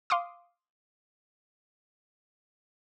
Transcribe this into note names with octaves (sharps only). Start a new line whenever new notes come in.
F5 C6 D6 D#6